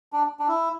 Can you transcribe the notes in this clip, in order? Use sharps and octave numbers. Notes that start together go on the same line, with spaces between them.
D4
D4
E4